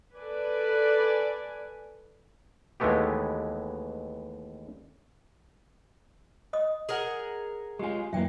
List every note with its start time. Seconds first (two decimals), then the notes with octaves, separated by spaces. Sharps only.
0.15 A4 B4 D5 G#5
2.80 D#2 E3 G#3 A3 B3 G4
6.53 D#5 D#6
6.89 G#4 A#4 F#5
7.79 G#3 F4 G4 G#5
8.13 F#2 E3 A#3 E5 G5